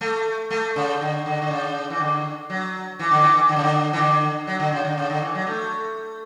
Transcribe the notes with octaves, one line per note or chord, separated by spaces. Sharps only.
A3
A3
C#3
D3
D3
D3
C#3
E3
D3
F#3
E3
D3
E3
D3
C#3
D3
E3
D3
F#3
D3
C#3
D3
C#3
D3
E3
F#3
A3